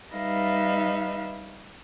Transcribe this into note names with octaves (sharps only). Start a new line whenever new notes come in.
G3 D#4 B4 E5 F5